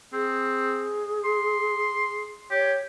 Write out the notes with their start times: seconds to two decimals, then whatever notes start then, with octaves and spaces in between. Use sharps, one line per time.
0.13 C4 G#4
1.25 C6
2.51 G4 C#5